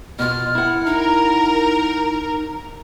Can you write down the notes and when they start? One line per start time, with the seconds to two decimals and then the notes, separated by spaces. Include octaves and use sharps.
0.19 B2 F4 F6
0.55 E4 F#5
0.86 D#4 A#4